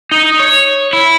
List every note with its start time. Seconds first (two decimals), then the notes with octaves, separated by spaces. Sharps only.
0.11 D#4
0.39 C#5
0.93 E4